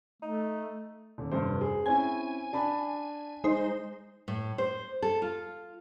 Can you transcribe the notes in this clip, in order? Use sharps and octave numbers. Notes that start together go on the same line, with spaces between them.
A3 D#4
D#1
F1 G2 C5
G#4
C4 C#4 E4 G#5
D4 A5 B5
G#3 D#4 C5
A2
C5
A4
F4